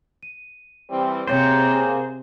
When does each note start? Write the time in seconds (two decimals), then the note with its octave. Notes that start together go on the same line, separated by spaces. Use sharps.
0.23 D#7
0.90 E3 G3 C4
1.28 C3 A#3 G#4 C5 C#5 G5